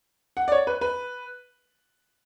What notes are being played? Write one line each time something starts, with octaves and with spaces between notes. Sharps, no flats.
F#5
D5
C#5
B4
B4